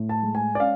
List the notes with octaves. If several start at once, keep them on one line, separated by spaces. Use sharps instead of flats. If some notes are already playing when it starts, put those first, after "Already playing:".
Already playing: A2
A5
G#3
G#5
D5
C#4 F5